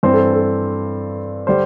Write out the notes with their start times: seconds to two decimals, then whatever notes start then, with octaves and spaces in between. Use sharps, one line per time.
0.03 G2 E3 C4 C5
0.14 A4
0.33 A4
1.47 D3 G3 C5